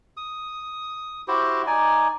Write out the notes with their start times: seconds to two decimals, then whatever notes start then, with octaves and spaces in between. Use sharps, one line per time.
0.17 D#6
1.28 E4 F#4 G4 C5
1.67 D#4 D5 G#5